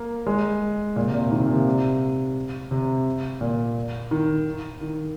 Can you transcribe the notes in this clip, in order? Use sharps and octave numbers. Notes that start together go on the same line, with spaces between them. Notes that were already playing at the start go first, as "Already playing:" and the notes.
Already playing: A#3
G#3
A#2
C3
A#2
D#3
C3
A#2
C3
C3
A#2
D#3
D#3